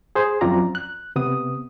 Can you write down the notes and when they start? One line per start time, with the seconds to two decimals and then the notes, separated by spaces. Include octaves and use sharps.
0.15 G#4 C5
0.41 F#2 F3 C4 F4 D5 A#5
0.75 F#6
1.16 C3 B3 D#6